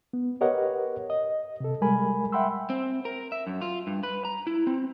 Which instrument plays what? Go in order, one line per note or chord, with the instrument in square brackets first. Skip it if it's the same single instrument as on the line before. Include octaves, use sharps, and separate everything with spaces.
[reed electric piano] B3
G4 A#4 B4 C#5 D#5 F#5
D#5
C3 A4
G3 G#3 A#4 G#5 B5
E5 F#5 G5 B5 C6 E6
[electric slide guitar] C4
A#4
E5
F#2
F4
G2
B4
A#5
E4
C4